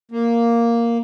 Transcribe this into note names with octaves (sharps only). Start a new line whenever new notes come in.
A#3